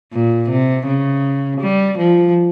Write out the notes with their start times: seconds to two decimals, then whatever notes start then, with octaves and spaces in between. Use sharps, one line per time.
0.12 A#2
0.49 C3
0.86 C#3
1.61 G3
1.98 F3